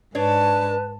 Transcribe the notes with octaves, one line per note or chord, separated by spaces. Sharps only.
G#2 D4 B4 C#5 A5